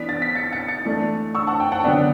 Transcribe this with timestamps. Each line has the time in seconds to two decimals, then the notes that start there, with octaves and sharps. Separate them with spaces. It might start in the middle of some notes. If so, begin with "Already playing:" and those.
Already playing: E3 B3 D4 B6 D7
0.09 A6
0.22 B6
0.35 A6 C#7
0.52 A6 C#7
0.68 A6 C#7
0.85 E3 A3 D4
1.35 C#6 E6
1.47 F#5 A5
1.60 G5
1.72 F#5 A5
1.84 D3 F#3 B3 D4 G5